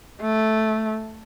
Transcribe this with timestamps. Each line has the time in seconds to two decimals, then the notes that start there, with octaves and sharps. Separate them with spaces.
0.22 A3